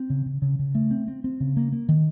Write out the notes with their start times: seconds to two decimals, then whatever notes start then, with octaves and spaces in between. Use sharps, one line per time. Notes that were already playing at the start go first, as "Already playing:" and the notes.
Already playing: C4
0.10 C#3
0.26 C#3
0.42 C#3
0.59 C#3
0.75 A3
0.91 C4
1.08 C4
1.24 C4
1.40 C#3
1.57 A#3
1.72 A#3
1.89 D#3